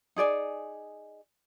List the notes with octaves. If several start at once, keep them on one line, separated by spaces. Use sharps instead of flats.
D#4 G#4 D5 G#5